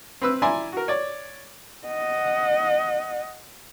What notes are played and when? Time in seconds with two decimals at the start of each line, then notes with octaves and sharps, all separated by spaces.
0.21 C4 B4 E6
0.42 E4 D5 E5 G#5 A#5 C6
0.72 F#4 A#4
0.88 C#5 D5
1.87 D#5 F#5